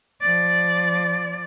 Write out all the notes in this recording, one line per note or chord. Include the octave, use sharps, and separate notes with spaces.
F3 D5